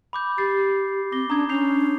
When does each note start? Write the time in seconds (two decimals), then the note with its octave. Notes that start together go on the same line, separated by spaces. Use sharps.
0.13 B5 D6 G6
0.38 G4 A6 C7
1.12 C4 D6 A#6 G7
1.30 C#4 D4 A#5 D#6 G#6
1.49 C#4 D4 G6 C7 F7